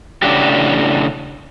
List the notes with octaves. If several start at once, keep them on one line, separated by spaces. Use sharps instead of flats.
A2 C#3 D4 F#4 G4